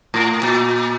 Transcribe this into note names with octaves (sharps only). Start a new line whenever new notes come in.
A2
A#2